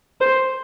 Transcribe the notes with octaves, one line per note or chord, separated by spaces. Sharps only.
C5